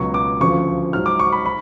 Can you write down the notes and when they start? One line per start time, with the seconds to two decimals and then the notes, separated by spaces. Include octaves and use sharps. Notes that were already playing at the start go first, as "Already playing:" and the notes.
Already playing: C#2 B2 F#3 C#6
0.14 D6
0.41 D2 C#3 F3 C#6
0.93 G#2 F#3 F6
1.06 D6
1.20 C#6
1.32 B5
1.46 B5